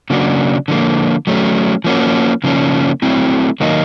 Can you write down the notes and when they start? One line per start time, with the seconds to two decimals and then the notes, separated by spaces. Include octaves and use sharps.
0.10 C#3 F#3 A#3 D4 F#4
0.68 D3 F3 A#3
1.27 F#3 A3 C#4
1.84 F3 A#3 C#4 F#4
2.44 C#3 F3 A#3 C#4
3.02 F#3 A3 C4 E4
3.60 D#3 F#3 A#3 D#4 F#4